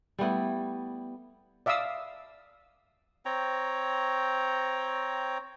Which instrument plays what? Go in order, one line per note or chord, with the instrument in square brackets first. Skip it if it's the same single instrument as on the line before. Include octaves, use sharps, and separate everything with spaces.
[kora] G3 A3 B3 E4
[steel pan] D5 E5 F5 D#6 E6
[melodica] C4 C#5 G5 A#5